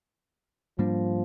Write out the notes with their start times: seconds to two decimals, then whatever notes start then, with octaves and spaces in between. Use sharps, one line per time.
0.79 G#2 F3 G3 A#3 D4